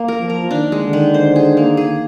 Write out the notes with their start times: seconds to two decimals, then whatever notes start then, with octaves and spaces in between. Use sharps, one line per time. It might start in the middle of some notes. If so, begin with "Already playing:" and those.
Already playing: A#3
0.08 A#4
0.19 F3
0.30 A#4
0.51 D#3 D4
0.72 G#3
0.83 D3
0.93 D#3
1.14 C5
1.36 G#4
1.57 A#3
1.77 G#4